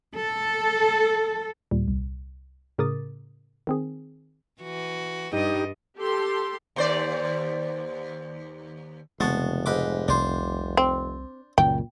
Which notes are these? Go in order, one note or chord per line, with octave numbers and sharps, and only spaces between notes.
A4
D#2 A#2 G3
C2
A2 C#3 A#4 D6 D#6 A6
D#3 C4 G#4
E3 F#4
G2 G3 D#4 G4 D#5
G4 A4 C6
D#2 C5 D5
F1 C#3 G#3 B3 A5 C#6
G#2 B4 D6
C2 D4 C5
C4
C#2 F#2 A#2 C#3 G5